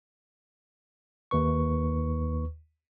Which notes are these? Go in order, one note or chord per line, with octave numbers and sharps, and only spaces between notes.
D#2 B4 C#6